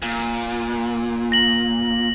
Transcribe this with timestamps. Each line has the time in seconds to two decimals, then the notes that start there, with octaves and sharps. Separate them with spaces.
0.02 A#2
1.32 A#6 F#7